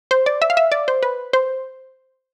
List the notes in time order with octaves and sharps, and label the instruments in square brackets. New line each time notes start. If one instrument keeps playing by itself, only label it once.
[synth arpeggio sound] C5
D5
E5
F5
E5
D5
C5
B4
C5